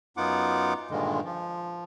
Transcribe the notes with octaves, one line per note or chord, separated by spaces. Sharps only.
F#2 B3 D#4 F4 F#5 D6
G2 A#2 D3 D#3 G#3
F3